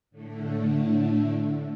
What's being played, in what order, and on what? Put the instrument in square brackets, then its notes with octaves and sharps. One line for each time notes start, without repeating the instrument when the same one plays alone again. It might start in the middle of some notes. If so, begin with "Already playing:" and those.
[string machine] A2 D3 A3